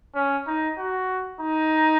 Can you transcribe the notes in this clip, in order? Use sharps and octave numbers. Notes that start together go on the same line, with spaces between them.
C#4
D#4
F#4
D#4